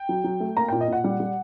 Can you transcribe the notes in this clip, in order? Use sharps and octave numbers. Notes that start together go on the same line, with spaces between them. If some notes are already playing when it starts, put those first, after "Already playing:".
Already playing: G5
F#3
F#3
A3
A#3 A#5
A#2 G5
D#5
A#2 F#5
G3
G3